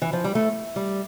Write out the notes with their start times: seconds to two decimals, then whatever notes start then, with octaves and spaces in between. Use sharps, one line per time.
0.02 E3
0.13 F3
0.24 G3
0.35 A3
0.76 G3